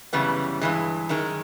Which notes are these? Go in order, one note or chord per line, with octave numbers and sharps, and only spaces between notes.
F#2 C#3 E3 G3 B3
G2 E3 G#3
F#2 D#3 G#3